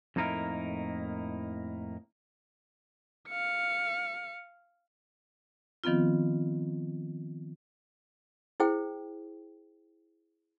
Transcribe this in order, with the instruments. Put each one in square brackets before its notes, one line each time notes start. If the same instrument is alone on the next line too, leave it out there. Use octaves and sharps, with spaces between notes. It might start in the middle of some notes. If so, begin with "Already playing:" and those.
[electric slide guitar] F2 A2 A#3 D#4 E4 A#4
[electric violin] F5 C#7
[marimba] D#3 F3 B3 C4 F4
[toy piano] E4 G#4 C5 G5